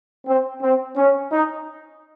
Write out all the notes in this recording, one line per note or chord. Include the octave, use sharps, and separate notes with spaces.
C4
C4
C#4
D#4